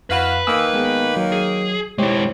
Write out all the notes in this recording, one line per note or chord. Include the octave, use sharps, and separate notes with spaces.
F2 E4 F#4 B4 F5 B5
D#3 A#3 G#5 D#6 E6
G#3 B3 G#4
F#3
G#4
G#3 E4 G4 C5 C#5